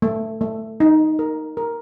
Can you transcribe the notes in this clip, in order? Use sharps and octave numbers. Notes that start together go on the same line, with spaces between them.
A3
A3
D#4
A#4
A#4